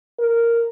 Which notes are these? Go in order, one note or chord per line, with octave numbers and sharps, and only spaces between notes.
A#4